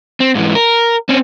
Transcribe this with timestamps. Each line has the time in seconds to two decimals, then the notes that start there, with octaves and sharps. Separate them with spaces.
0.20 C4
0.35 G#2 E3
0.55 A#4
1.09 C4 C#4